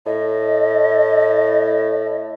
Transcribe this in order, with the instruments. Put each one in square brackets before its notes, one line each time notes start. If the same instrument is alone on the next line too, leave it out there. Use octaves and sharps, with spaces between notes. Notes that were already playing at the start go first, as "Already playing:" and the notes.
[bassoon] A2 [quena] D#5